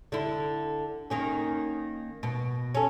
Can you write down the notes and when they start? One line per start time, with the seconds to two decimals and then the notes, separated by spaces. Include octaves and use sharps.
0.12 D3 E4
1.10 D#3 A#3 C#4
2.23 B2
2.75 C#4 A4